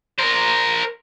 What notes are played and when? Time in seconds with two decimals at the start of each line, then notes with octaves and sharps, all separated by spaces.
0.19 A#4 C5